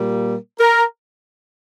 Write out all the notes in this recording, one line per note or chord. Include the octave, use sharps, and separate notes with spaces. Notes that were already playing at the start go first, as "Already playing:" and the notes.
Already playing: A#2 G3 A#3
A#4